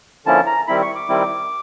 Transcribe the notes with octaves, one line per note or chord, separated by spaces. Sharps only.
D3 F3 A#3 C#4 E4 A5
A#5
D#3 G3 C4 E4 B5
C#6
D6
D#3 G3 C4 E4